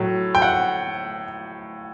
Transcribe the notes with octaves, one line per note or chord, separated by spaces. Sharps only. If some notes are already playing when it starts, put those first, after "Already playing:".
Already playing: A2 F#3
G5
F#5